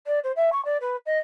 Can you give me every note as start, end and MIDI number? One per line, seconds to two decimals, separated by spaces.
0.07 0.19 74
0.24 0.32 72
0.36 0.50 76
0.52 0.63 85
0.65 0.77 74
0.81 0.96 71
1.06 1.18 75